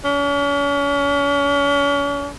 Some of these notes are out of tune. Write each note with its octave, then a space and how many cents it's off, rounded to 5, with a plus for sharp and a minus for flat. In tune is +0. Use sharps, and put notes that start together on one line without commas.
C#4 +40